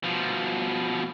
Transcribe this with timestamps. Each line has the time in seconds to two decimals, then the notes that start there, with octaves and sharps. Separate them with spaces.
0.04 B2 F3